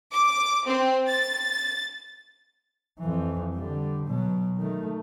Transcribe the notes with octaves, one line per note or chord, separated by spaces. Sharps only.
D6
C4
A6
F2 E3
D3 G3
B2 F#3
D#3 A3